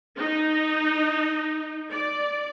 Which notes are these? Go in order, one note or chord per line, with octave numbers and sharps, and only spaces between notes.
D#4
D5